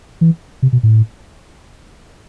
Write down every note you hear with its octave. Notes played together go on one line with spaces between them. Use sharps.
E3
C3
B2
A2